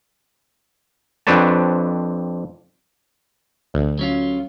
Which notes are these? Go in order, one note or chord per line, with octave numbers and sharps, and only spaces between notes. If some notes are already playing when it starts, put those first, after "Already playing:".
F2 C4 D4 B4 C#5 A5
D2
F#3 C#4 F4